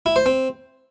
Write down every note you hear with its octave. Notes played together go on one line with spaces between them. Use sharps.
E4
C5
C4